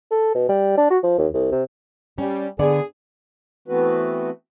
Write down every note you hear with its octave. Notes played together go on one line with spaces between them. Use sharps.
A4
B2
G3
D4
F#4
F3
D#2
C2
C3
G3 C#4
D3 B3 G#4 D5
E3 A3 B3 C4 F#4 B4